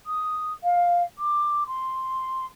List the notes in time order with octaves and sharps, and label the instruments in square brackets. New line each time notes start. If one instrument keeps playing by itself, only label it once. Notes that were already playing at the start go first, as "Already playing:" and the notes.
[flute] D#6
F5
D6
C6